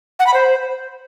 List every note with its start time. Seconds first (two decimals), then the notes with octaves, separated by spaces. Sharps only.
0.19 F#5
0.27 B5
0.34 C5